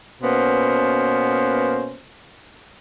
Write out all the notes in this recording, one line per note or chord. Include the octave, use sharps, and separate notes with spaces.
B2 A#3 B3 C#4 C5